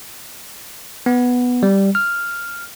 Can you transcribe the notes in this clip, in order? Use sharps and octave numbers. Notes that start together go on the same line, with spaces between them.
B3
G3
F6